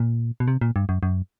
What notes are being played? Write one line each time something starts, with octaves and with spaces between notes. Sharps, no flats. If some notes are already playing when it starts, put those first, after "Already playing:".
Already playing: A#2
B2
C3
A#2
G2
F#2
F#2